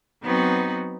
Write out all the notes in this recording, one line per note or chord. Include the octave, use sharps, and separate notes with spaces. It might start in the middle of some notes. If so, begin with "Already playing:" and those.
F#3 B3 C4 D#4 F#4 B4